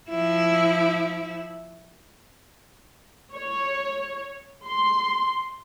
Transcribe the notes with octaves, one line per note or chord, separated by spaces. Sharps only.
F3 E4
C#5
C6